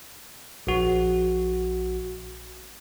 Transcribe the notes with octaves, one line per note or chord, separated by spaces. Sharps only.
A#1 F#4